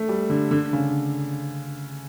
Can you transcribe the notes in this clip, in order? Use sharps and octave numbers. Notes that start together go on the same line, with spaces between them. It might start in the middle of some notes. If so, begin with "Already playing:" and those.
Already playing: A3
G3
D3
D3
C#3